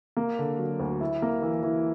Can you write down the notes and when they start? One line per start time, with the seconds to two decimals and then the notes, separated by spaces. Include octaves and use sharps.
0.17 A#3
0.39 D3
0.58 F#3
0.79 D2
1.01 E4
1.22 A#3
1.42 E3
1.63 E3